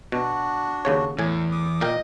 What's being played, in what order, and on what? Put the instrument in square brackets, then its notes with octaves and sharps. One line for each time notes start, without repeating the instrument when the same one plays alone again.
[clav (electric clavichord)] B2 [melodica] D4 F#4
[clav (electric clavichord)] D#2 C#3 C#5
[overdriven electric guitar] E2 E3 [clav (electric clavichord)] A2 G#5
[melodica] D6 D#6
[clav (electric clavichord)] A#2 A#4 G5 [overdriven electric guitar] D#5 E5